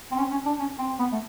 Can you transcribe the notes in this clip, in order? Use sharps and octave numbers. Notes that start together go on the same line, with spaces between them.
C4
C#4
C#4
D4
C#4
C4
B3
A3